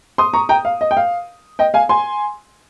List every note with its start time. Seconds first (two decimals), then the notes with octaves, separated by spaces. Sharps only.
0.18 C6 D#6
0.33 A#5 C#6
0.49 G5 A#5
0.65 F5
0.81 D#5
0.91 G5
0.97 F5
1.59 D#5 G5
1.74 F5 G#5
1.89 G#5 C6